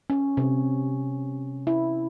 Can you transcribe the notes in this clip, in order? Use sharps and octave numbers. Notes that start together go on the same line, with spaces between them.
C#4
C3
E4